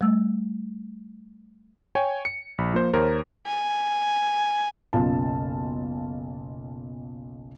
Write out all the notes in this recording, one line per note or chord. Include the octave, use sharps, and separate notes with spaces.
G3 A3 E6
C#5 G5 G#5
C#7
A#1 B5
F3 A#3 C5
D#2 A#4 C5 C#5
G#5
F#1 B1 F4 A5